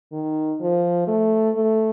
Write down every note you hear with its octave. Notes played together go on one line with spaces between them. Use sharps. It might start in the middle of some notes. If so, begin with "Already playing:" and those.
D#3
F3
A3
A3